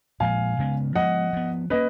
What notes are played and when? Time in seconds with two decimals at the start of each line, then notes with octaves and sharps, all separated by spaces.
0.20 A#2 F3 G#3 F5 G#5
0.59 C#3 G#3 B3
0.96 F3 G#3 B3 D#5 F#5
1.33 F3 B3
1.70 A#3 C#4 B4 D#5